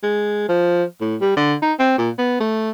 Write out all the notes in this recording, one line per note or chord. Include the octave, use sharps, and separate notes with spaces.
G#3
F3
A2
G3
D3
D#4
C4
A#2
B3
A3